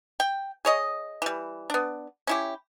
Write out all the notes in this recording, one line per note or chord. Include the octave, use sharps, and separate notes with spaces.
G5
G#4 C#5 D#5
E3 G3
B3 D4
C#4 E4 G4